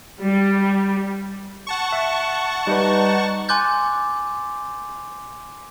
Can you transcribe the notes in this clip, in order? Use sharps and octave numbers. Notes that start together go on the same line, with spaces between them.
G3
F#5 A5 C#6
E5
G3 D#4 B4 D5
G#5 C6 D6 F#6 G6 A6